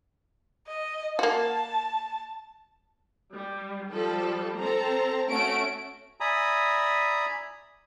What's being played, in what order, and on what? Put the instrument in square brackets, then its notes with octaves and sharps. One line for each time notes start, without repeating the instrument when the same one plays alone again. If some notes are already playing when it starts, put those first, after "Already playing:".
[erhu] D#5
[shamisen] A#3 F#4 [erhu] A5
[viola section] G3
[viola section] F3 G3 [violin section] A4
[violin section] C4 A#5 [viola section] A4
[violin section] A3 F#4 D7 [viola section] C#4
[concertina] D5 E5 G#5 A#5 B5 D#6